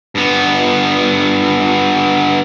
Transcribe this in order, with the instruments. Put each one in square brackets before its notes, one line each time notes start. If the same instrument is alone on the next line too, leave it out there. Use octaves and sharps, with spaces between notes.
[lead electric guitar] G2 B3